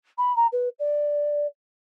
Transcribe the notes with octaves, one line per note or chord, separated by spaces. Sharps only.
B5
A#5
B4
D5